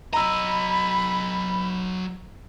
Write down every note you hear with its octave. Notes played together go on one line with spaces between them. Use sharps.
F#3 D#5 A#5 B5 E6